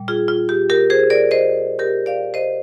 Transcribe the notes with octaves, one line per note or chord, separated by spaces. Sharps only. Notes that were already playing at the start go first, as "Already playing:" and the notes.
Already playing: A#2 G3
F4 G#4
F4
G4
G4 A#4
G#4 C5
A#4 D5
C5 D#5
G4 A#4
D5 F5
C5 D#5